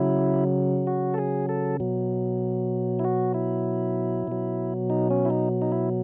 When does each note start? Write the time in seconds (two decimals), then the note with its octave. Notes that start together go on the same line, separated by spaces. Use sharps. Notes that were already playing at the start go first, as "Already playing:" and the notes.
Already playing: C#3 F#3 E4
0.87 F#4
1.14 A4
1.18 G#4
1.49 A4
1.80 B2 F#3
2.99 E4
3.04 F#4
3.34 E4
4.27 B2 F#3
4.90 D#4
5.10 C#4
5.25 E4
5.30 D#4
5.62 D#4
5.72 E4